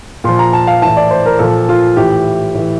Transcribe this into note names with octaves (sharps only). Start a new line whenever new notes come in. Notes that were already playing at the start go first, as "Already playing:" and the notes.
A#2 F3 C6
A#5
A5
F5
A2 E3 A5
D5
C5
A#4
A#2 F3 A4
F4
A2 E3 G4
A2 E3